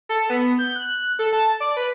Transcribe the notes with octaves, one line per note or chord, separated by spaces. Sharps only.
A4
B3
G6
F#6
A4
A5
D5
B4